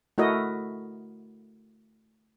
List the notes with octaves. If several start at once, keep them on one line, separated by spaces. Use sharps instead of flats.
A3 E4 F#4 A#4 D#5